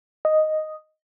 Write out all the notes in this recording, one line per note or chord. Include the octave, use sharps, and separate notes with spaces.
D#5